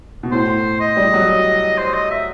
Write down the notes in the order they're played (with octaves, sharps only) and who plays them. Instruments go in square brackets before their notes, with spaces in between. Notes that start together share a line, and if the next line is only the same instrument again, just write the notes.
[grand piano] B2
[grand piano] A2 [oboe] C5
[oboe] D#5
[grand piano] G3
F#3
[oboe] C5
D#5
E5